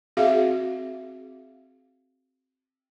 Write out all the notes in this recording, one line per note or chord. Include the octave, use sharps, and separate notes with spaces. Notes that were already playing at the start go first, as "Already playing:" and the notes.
C4 F#4 G#4 E5 F5